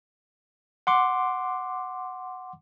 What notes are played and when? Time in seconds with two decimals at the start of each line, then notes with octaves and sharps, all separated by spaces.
0.87 F#5 C6 D6